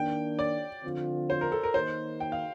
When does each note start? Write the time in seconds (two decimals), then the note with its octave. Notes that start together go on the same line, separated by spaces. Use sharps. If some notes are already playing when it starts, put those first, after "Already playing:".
Already playing: D#3 A#3 D4 G5
0.39 D5
0.84 D3 F3 C4 F4
1.30 C5
1.41 A#4
1.52 A4
1.63 A#4
1.74 D#3 A#3 D#4 C5
2.20 G5
2.32 F5